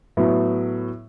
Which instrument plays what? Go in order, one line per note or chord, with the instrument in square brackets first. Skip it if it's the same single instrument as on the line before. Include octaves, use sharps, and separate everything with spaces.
[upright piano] A2 F#3 B3